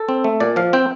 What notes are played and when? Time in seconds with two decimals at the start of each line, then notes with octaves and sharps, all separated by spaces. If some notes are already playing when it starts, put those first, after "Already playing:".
Already playing: A4
0.09 C4
0.24 A3
0.40 A#2 D5
0.56 F3 F5
0.73 C4 G5